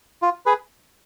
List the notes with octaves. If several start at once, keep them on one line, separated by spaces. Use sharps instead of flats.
F4
G#4 B4